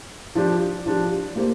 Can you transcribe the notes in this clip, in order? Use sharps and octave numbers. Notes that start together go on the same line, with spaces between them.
F3 D4 G4
F3 D4 G4
A#3 G4 C5